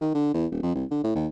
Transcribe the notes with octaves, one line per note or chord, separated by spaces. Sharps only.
D#3
D3
E2
D#1
F2
C2
D3
A2
D#2